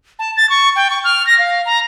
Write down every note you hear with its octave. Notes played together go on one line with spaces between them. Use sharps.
A5
A6
C#6
G5
C#6
F6
A#6
F5
A#5